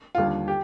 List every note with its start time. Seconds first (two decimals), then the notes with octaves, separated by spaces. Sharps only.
0.15 D#2 D3 G3 F4
0.48 G4